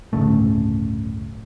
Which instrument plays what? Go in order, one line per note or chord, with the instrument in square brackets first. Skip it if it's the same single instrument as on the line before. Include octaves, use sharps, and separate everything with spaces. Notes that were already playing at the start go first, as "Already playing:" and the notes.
[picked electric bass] D1 G1 C#3 A3